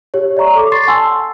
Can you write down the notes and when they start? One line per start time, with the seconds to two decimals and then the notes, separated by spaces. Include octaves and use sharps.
0.14 G4 C#5
0.37 D5 E5 A#5 C#6
0.55 A4 D6
0.72 C6 C#6 A6 C7
0.87 F#5 G#5 A5 C6 E6